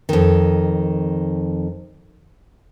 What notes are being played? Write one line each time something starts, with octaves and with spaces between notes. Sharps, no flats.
F2 D#3